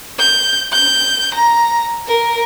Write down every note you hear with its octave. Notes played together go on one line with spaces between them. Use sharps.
G6
G6
A#5
A#4